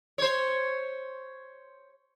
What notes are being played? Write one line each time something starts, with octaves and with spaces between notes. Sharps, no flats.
C5 C#5